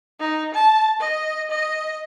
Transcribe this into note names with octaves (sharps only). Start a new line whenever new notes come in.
D#4
A5
D#5
D#5